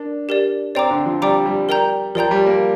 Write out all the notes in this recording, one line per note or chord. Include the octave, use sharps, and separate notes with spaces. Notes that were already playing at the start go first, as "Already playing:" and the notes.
Already playing: D4 A#4 D5
G4 A#4 D5
C4 D5 G5 A#5 D6
D3
F3
G3 D5 G5 A#5 D6
G3
A#4 D5 G5 A#5 G6
F3 A#4 D5 G5 A#5 G6
G3
A#3